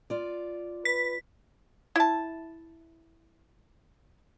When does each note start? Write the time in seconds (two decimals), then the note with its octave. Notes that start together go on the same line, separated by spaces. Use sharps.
0.10 F4 D5
0.85 B4 B6
1.96 E4 A5